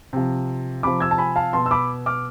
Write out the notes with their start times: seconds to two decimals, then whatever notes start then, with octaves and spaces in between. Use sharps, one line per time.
0.13 C3 F3
0.83 C3 F3 B5 D6
1.00 E6 G#6
1.11 A5
1.18 G#5 B5
1.36 F5 A5
1.53 B2 A5 C6
1.66 E6
1.71 B5 D6
2.06 D6 F6